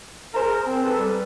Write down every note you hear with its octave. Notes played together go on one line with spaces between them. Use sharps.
G#4 A#4 C5 A#5
C4
A4 B4
G3